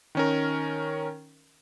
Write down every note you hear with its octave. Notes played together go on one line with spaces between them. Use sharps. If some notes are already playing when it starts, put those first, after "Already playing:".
D#3 C#4 A#4